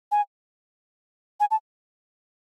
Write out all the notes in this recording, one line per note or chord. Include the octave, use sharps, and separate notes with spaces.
G#5
G#5
A5